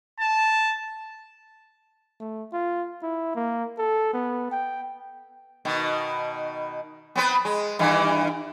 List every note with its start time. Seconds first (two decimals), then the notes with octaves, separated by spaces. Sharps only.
0.20 A5
2.20 A3
2.53 F4
3.03 E4
3.35 A#3
3.78 A4
4.13 B3
4.52 G5
5.65 B2 D#3
7.15 B3 C4 B4
7.45 G#3
7.79 G2 D#3 E3